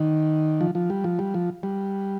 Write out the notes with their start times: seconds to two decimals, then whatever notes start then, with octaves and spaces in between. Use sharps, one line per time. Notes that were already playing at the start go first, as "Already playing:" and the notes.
Already playing: D#3
0.61 F3
0.75 F3
0.90 G3
1.04 F3
1.19 G3
1.34 F3
1.63 G3